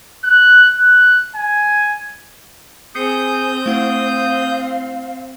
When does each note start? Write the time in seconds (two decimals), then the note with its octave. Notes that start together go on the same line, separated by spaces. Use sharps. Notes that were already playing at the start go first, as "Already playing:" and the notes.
0.24 F#6
0.74 F#6
1.36 G#5
2.95 C4 G#4 D#6 G6 C7 C#7
3.66 A3 E4 F5 F#5